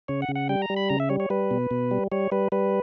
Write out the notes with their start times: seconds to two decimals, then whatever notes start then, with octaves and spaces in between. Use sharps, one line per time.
0.08 C#3 C#5
0.22 F#5
0.29 C#3
0.35 F#5
0.49 G3 G5
0.62 A#5
0.70 G3
0.76 B5
0.89 C#3 A#5
1.00 E5
1.10 G3 C#5
1.20 C#5
1.30 G3 B4
1.51 B2
1.71 B2
1.91 G3
2.12 G3 C#5
2.32 G3 B4
2.52 G3 B4